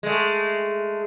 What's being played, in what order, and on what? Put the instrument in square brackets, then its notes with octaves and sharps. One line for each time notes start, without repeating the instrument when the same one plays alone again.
[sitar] G#3 A3